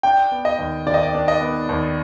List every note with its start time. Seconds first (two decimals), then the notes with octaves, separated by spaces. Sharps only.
0.03 D4 G5
0.31 B3
0.45 D#5
0.59 D#2
0.87 D#3 D5
0.94 D#5
1.03 D5
1.14 D4
1.28 D#5
1.41 B3
1.69 D#2